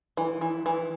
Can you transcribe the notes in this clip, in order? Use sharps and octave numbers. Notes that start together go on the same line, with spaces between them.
E3
E3
E3